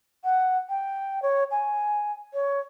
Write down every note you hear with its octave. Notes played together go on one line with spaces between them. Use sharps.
F#5
G5
C#5
G#5
C#5